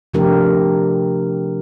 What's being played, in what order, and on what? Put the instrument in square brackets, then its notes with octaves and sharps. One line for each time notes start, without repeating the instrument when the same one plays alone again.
[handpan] C3 F3 A3 D4 G4 A#4